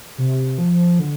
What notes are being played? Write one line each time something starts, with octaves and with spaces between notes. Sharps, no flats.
C3
F3
D3